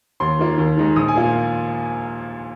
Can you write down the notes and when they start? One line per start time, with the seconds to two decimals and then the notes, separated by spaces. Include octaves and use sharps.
0.20 D#2 C6
0.39 D#3 A#3 F4
0.58 D#2
0.77 D#3 G#3 D#4
0.96 A#1 D#6
1.08 G#5
1.15 A#2 A#3 F4